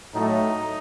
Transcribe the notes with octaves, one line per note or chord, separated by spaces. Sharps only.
A2 F#3 A3 D#4